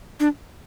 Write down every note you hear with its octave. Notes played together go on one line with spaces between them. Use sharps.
D4